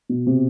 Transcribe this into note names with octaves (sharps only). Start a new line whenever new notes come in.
B2
C3